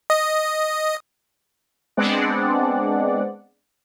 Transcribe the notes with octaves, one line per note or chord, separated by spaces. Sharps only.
D#5
G#3 B3 C4 D4 D5 F#5